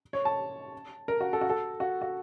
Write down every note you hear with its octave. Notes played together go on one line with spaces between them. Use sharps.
C#5
A5
A#4
F#4
A4
F#4
A4
F#4
F#4